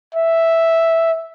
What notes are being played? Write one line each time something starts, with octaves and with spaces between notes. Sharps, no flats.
E5